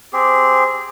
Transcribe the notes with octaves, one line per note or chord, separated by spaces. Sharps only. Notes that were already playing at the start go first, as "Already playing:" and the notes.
C4 G4 G#4